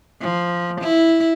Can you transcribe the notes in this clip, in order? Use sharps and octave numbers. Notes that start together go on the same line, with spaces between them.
F3
E4